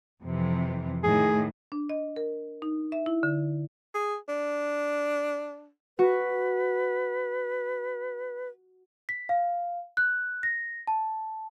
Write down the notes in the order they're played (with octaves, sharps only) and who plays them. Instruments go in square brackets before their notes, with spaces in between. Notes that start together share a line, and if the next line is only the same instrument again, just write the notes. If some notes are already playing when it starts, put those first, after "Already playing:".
[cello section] F2 C3 E3
[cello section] A2 D#3 [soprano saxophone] G#4
[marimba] D4
D#5
A#4
D#4
E5
E4
D3
[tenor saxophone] G#4
D4
[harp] F#4 [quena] B4
[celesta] B6
F5
F#6
A#6
A5